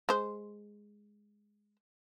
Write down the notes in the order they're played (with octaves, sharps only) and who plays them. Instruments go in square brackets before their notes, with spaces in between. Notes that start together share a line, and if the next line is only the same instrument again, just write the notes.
[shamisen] G#3 C5